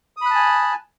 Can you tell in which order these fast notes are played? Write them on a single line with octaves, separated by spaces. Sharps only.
D#6 B5 F#6 A5 G#5